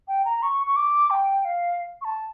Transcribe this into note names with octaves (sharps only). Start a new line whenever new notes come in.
G5
A#5
C#6
C#6
D6
G5
F5
C#6
A5